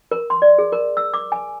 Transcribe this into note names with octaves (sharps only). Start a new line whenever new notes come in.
A#4
C6
D5
G#4
A#4
E6
D6
G#5